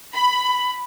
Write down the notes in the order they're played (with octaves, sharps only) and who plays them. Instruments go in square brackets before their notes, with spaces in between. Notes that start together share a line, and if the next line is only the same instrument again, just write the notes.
[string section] B5